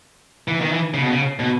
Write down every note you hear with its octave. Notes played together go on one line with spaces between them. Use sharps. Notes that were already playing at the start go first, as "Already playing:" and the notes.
E3
D#3
E3
C#3
B2
C#3
B2